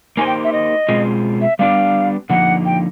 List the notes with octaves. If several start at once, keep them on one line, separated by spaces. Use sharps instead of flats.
A#3 D#4 G4 C5 G#5
G5
E5
D#5
B2 G#3 C4 F4 G#4
E5
G3 B3 D4 G4 F5
D3 F3 A#3 D#4 F#5
G5